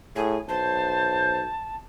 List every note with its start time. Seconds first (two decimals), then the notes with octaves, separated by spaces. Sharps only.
0.15 A2 G#4
0.48 B1 C5 A5